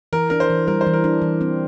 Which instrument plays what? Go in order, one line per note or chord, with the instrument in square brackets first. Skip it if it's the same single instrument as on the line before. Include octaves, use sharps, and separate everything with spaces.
[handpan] E3 [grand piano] A#4
[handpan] D4 [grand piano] A#4
[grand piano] C5
[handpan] E3
[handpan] G3 [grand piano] A#4
[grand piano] C5
[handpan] E3
[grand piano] A#4
[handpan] D4
E3
C4